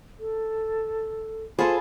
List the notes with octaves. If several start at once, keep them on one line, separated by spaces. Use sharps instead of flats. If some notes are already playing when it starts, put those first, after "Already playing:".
A4
F4 G#4 A4 C5 B5